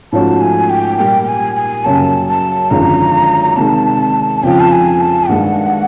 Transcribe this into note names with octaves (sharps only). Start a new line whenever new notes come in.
G#2 F3 A3 C#4 F#4 A5
G#5
G5
A#2 G3 A#3 G5
G#5
G#5
F#2 C#3 F#3 A#3 A5
A5
G#1 F#2 D3 F3 G#3 A#5
C3 D#3 G#3 A5
F2 C#3 F3 G5
A5
G#5
A5
G2 D#3 G#3 F#5